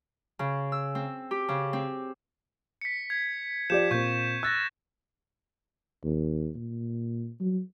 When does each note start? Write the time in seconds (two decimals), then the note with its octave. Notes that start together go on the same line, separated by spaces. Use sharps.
0.39 C#3
0.72 E6
0.95 C4
1.31 G4
1.48 C#3
1.73 C4
2.81 B6 C#7
3.10 G#6
3.70 F3 G4 D5 G6 E7
3.91 A#2 C4 C#6 G6
4.43 E6 F#6 A6 A#6
6.04 D#2
6.56 A#2
7.40 F#3